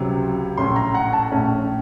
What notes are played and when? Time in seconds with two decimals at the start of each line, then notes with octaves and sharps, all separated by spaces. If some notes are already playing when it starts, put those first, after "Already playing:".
Already playing: C#2 C3 F#3
0.57 A#1 A2 A3 C#4 C6
0.76 A#5
0.94 F#5
1.13 A5
1.32 A#1 A2 A3 C#4